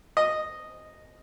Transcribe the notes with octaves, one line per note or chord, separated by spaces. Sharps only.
D#5